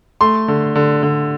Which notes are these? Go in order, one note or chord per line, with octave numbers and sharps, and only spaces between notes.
A3 C6
D3
D3
D3